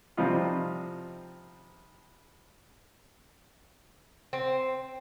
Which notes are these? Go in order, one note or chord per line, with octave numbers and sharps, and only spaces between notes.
C3 F3 G3 D#4 F4
C4